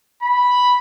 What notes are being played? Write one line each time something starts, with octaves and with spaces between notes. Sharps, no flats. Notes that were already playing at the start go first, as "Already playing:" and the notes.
B5